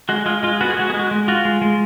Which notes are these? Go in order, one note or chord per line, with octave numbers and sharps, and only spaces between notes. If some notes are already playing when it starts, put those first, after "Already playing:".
G#3 F#4
G#3 F4
G#3 F4
B3 F#4
G#4
G#3 F#4
G#4
G#3
F#4
G#3
F4 F#4
G#3
G#3